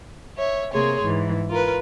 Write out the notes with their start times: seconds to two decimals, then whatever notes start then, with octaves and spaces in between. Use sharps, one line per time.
0.37 C#5 E5
0.72 C3 A#3 G#4 C#5 C6
1.01 G#2 E3
1.50 F4 A#4 B4